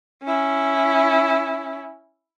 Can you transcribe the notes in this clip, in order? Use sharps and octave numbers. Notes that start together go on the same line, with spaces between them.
C#4 E4